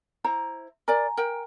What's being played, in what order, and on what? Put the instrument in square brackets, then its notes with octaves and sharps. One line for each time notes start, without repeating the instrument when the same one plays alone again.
[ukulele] E4 C5 A#5
[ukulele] A#4 D5 [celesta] G#5 A#5
[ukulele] A#4 G5